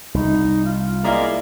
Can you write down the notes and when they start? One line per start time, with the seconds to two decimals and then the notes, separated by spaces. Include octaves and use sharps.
0.14 C2 D#4
0.65 F4
1.04 G#3 A#3 E4 D5 A#5